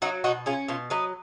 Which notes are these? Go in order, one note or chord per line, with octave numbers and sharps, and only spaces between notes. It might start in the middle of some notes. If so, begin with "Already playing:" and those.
F#3 D#4 F#4
B2 D#4 F#4
C#4 F4 G#4
B2 F4
F#3 B4 D#5